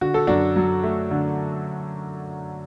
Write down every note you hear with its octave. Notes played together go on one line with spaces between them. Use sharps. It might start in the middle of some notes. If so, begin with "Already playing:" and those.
D3 F#4
A4
F#2 D4 F#4
F#3
A3
D3